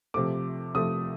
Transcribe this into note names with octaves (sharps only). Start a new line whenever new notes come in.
C3 F3 A3 D6
C3 F3 A3 D#6